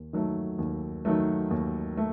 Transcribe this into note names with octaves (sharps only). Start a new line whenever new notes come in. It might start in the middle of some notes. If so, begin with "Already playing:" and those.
Already playing: D#2
D#3 F#3 A3
D#2
D#3 F#3 A3
D#2
A3